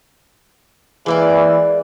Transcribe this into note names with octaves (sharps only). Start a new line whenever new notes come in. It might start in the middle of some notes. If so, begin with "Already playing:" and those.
E3 G#3 A#3 D5